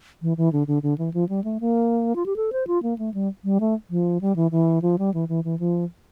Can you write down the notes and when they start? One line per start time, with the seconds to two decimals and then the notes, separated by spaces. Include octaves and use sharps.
0.22 E3
0.37 E3
0.53 D3
0.67 D3
0.83 D3
0.98 E3
1.14 F3
1.29 G3
1.44 A3
1.60 A#3
2.16 F4
2.26 G4
2.36 A4
2.52 C5
2.67 F4
2.83 A#3
2.98 A3
3.14 G3
3.44 G3
3.60 A3
3.90 F3
4.21 G3
4.36 E3
4.51 E3
4.82 F3
4.99 G3
5.14 E3
5.29 E3
5.44 E3
5.59 F3